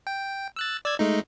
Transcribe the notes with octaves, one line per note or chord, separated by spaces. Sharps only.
G5
E6 F#6 A6
D5 E6 G#6
G#3 A3 D#4